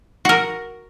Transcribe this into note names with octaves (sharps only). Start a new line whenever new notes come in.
F#4 A#4